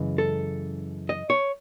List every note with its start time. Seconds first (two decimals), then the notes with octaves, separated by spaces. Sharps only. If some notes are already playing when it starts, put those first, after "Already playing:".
Already playing: F#2 C#3 E3 G#3
0.18 A4
1.09 D#5
1.30 C#5